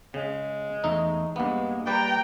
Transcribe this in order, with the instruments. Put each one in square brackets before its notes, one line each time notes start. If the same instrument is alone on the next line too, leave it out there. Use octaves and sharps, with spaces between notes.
[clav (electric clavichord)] C#3 [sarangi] G#3
[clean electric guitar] E2 A3 [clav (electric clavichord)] D#4
[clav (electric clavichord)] G2 B3 [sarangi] G#3 [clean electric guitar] A#3
[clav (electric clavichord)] G3 B4 D5 [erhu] G5 [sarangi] A#5